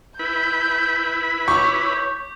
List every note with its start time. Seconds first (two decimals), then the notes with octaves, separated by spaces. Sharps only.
0.19 E4 B4 B5 G6
1.48 C#5 C#6 D6 G6 B6